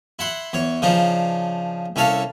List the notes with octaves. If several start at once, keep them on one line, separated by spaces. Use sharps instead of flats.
E4 F#5 C6
E2 C#5
C#3 F3 D4 D#4
C2 C#4 A4 C#5 F5